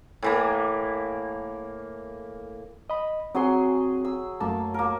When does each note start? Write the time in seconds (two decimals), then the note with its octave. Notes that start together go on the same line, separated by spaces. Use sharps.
0.23 A2 E3 A#3
2.90 D#5 B5
3.35 F#3 C4 G#4 C6
4.05 E6
4.40 F#2 A3 A#3 A5
4.74 A#3 A#4